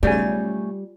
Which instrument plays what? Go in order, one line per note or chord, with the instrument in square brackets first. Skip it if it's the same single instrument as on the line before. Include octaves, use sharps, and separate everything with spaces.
[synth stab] B1 C#3 [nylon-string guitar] G3 [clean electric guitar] A3 G#5 [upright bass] F4